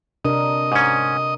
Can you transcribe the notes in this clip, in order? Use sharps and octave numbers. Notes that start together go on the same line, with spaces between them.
C3 D4 A#4 D#5
G#2 C#4